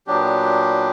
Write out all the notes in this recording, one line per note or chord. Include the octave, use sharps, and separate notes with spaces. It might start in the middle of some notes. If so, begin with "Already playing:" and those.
A#2 F#3 B3 D4 G4